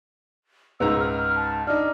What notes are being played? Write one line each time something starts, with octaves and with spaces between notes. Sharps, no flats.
C#2 G#2 A#5 E6
F6
A5
D4 D#4 F6